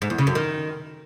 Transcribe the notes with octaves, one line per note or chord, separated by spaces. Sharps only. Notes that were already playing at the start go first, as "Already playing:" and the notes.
G#2
E2
C#3
F#2
D#3